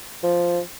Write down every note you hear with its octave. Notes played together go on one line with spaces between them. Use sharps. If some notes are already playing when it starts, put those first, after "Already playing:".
F3